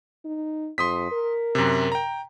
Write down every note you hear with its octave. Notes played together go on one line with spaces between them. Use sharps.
D#4
F2 C6 D#6 B6
A#4
F#2 C3
G5 A#5